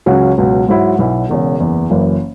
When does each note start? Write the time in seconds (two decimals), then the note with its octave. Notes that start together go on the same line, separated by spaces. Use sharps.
0.06 C#2 C#3 F#3 C#4 F#4
0.38 C#2 B2 F#3
0.68 G#2 F#3 E4
0.98 B1 B2 F#3 E4
1.29 E1 E2 C#3
1.60 F#1 E2 E3
1.90 F#1 F#2 E3